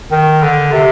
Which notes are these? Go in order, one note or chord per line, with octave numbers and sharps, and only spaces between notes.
D#3
D3
C3